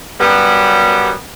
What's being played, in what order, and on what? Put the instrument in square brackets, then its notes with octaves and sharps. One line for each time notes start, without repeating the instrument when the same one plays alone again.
[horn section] F#2 G3 B3